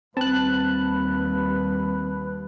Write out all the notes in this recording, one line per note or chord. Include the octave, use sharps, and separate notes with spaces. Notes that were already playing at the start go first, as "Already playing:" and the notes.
D#2 G3 C4 B4 A5 F#6